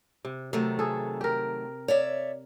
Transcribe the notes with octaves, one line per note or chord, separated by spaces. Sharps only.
C3
C3 D#3 F#3 A3
G#4 A4
G4 A#4
C#5 D5 E5